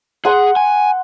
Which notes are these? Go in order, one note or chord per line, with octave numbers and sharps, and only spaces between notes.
G#4 F#5 C6
G#5